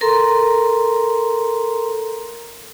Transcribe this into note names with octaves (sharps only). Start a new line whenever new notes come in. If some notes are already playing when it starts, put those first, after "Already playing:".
A4 A#4 A#5 C6